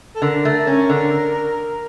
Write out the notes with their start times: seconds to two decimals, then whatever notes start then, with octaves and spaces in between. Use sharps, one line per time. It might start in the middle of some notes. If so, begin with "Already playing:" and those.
0.16 A4
0.22 D3 A#4
0.45 A3
0.67 C#4
0.89 D3